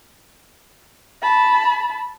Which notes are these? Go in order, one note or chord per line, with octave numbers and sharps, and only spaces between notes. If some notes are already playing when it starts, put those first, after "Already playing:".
A5 B5